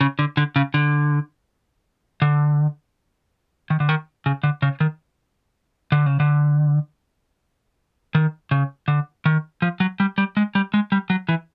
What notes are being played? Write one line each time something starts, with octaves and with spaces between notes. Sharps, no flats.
C#3
D3
D3
C#3
D3
D3
D#3
D3
D#3
C#3
D3
C#3
D#3
D3
C#3
D3
D#3
C#3
D3
D#3
F3
F#3
G3
G3
G#3
G3
G#3
G3
F#3
E3